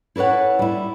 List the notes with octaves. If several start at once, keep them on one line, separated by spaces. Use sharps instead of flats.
E4 A4 B4 C#5 F#5
G3 E4